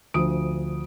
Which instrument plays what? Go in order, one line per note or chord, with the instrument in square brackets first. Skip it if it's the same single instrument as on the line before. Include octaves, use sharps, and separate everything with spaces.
[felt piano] D2 F3 D#6 D7